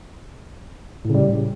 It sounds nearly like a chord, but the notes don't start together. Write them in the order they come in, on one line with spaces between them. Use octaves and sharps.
A2 C#3 G3